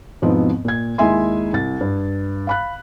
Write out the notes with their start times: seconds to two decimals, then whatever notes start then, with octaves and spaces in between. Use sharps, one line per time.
0.22 E2 G#2 B2 F3 B3 C4
0.65 A#2 G#6
0.98 D#2 G#3 E4 E5 G#5 C6
1.53 C2 A6
1.81 G2
2.47 F5 B5 F#6